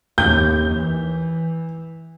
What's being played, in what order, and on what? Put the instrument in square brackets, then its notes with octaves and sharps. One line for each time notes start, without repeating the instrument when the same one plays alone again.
[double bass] D#2 [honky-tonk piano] G6
[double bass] E3